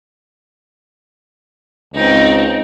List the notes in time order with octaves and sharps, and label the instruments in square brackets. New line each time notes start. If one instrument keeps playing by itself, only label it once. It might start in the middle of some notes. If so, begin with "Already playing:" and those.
[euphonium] C#2 [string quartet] C4 D#4